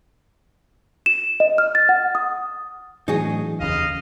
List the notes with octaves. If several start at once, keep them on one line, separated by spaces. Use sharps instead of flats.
E7
D#5
F6
A6
F#5
D#6
A2 E3 F#3 D4 D#4 F#4 G#4
F1 D#2 C#3 D#5 F5